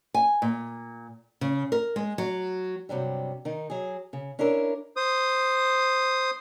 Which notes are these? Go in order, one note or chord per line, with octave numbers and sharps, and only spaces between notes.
G#5
A#2
C#3
A#4
G#3
F#3
G2 C3 F#3 G3
D#3 D#4
F#3 G#4
C#3
C#4 D4 E4 A#4
C5 D#6